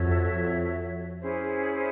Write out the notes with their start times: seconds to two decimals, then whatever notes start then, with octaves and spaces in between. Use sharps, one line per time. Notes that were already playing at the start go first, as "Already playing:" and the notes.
Already playing: F2 F#4 A4 C#5 E5
1.20 C#4 E4 G#4 C5